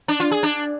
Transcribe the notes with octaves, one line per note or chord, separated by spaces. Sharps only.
D4
F4
G#4
D4